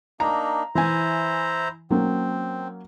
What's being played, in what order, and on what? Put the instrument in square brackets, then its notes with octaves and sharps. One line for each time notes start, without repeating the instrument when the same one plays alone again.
[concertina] A#3 D4 D#4 [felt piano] A#5
[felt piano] E3 G#5 [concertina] E4 C5 A#5
[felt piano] F#3 A#3 C#4 [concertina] C4